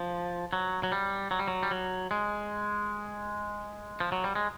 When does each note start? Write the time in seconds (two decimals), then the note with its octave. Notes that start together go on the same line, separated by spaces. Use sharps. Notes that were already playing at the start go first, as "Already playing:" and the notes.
Already playing: F3
0.53 F#3
0.83 F#3
0.92 G3
1.31 F#3
1.39 G3
1.48 F#3
1.63 G3
1.71 F#3
2.11 G#3
4.00 F3
4.12 F#3
4.24 G3
4.35 G#3